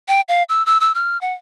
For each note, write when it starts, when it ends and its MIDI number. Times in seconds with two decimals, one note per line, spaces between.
0.08 0.21 79
0.29 0.43 77
0.49 0.65 88
0.66 0.80 88
0.80 0.94 88
0.94 1.20 89
1.21 1.34 78